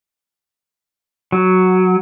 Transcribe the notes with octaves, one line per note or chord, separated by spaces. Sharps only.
F#3